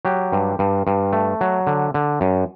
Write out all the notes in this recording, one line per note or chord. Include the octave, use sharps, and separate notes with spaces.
F#3 G4
G2
G2
G2
A3
F#3
D3
D3
F#2